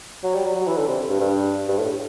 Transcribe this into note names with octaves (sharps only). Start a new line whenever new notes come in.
F#3
G3
F#3
F#3
E3
D3
C3
G2
G2
G2
A2